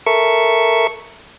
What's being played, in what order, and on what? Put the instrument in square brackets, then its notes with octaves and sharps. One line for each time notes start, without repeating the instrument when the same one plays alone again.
[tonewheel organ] A4 A#4 E5 C#6